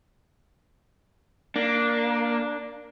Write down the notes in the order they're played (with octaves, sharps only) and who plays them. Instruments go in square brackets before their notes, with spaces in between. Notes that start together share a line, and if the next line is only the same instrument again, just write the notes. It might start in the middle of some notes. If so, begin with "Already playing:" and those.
[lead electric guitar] A#3 [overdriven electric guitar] D4